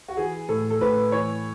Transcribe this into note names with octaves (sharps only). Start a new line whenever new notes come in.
F#4
E3 G#4
A2 A4
A4
A2 B4
E3 C#5